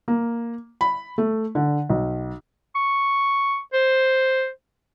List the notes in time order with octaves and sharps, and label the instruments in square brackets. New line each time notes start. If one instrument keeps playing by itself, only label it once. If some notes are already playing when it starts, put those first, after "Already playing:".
[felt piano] A#3
B5
A3
D3
B1
[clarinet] C#6
C5